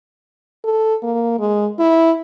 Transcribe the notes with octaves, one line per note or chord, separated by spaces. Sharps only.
A4
A#3
G#3
E4